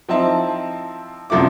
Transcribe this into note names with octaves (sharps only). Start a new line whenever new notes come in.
F3 C4 D#4 E4 A5
C2 F#2 F3 A3 E4 D6